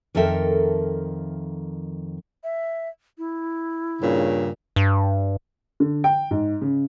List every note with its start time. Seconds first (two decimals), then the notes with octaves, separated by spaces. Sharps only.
0.15 F2 D#3 A4 A#4 E5 G5
2.44 E5
3.18 E4
4.00 G2 A#2 C#3
4.76 G2
5.80 D3
6.04 G5
6.31 G#2
6.61 C#3